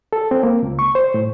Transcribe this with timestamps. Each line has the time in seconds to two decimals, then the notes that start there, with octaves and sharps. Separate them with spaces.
0.13 A4
0.31 C4
0.43 A#3
0.63 C#2
0.79 C#6
0.95 C5
1.14 A2